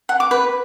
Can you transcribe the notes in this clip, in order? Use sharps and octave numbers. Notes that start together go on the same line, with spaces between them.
F#5
D6
B4